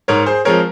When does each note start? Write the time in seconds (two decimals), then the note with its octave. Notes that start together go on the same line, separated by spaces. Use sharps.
0.08 G#2 A#4 C#5
0.26 G#4 C5
0.45 F3 G#3 C4 A#4 C#5